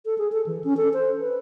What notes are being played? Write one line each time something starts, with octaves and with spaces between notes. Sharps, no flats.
A4
G#4
A4
E3
C#4
A4
C5
B4